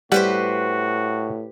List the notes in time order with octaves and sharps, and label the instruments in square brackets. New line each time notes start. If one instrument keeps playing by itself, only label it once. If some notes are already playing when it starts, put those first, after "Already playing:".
[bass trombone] A2 [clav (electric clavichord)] G3 F#5 [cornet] F#4 [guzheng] G4 B4 C5